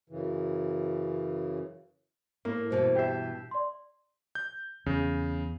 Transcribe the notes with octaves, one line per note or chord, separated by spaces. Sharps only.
F#2 C#3 E3
A2 A#3
G2 B2 E3 C5
G4 E5 G5 G6 C7
D5 C6
G6
E2 C#3